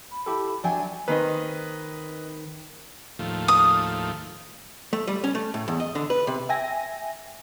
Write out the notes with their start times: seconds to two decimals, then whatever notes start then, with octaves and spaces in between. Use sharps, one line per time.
0.11 B5
0.26 E4 G4 A4
0.64 F#3 D4 D5 E5 G5 G#5
1.08 D#3 C4 B4 D#5
3.19 D#2 A2 F3
3.48 D#6
4.93 A3
5.07 G3
5.24 C#4
5.35 A3
5.54 A2
5.68 E2
5.80 D#5
5.95 D3
6.10 B4
6.27 C3
6.49 E5 G5 G#5 A#6